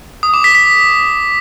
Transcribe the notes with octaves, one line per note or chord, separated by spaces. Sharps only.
D#6
D6
B6
B6